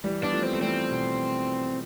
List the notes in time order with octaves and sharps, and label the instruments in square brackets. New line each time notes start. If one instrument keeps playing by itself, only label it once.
[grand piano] E3 G3
[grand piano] B3 [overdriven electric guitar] D4
[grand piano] F3 A3
[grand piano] B3 [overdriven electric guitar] C4
[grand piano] A3
[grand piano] E3 G3 [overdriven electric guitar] C4
[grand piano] B2